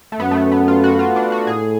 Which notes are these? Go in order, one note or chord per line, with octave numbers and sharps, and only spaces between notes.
A3
F#2 B3
A3
B3
B3
F4
F#4
F4
D4
F#4
A2 G#4